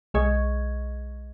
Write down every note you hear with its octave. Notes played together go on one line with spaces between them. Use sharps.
B1 G#3 G#4 D#5 C#6 G#6